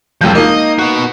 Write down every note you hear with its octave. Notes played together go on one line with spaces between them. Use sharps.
E1 C2 F3 C4 G6
A#3 D#4 D#5
B3 F#4